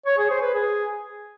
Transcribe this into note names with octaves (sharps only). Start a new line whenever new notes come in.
C#5
G#4
C5
B4
G#4